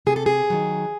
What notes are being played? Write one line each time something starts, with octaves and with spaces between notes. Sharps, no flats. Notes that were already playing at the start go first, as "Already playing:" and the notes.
C3 G#4
A4
G#4
D#3 F#3